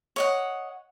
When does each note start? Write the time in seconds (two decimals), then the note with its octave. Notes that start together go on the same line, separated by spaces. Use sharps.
0.16 C#5 D#5 F#5